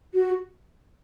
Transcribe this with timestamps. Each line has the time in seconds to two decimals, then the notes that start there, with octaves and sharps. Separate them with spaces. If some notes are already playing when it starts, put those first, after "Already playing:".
0.14 F#4